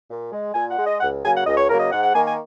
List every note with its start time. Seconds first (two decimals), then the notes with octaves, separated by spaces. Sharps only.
0.09 A#2
0.32 G#3
0.54 A#2 G#5
0.70 F#5
0.78 G#3
0.85 D#5
1.01 C#2 F#5
1.24 C#3 F#3 A#3 G#5
1.35 F#5
1.47 C#2 D#5
1.58 C#5
1.69 C#3 F#3 A#3 A#4
1.80 D#5
1.91 G#2 F#5
2.03 F#5
2.14 D#3 A#3 G#5
2.26 G#5